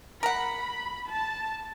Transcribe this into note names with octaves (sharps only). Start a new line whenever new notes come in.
A#4 F#5 B5
A5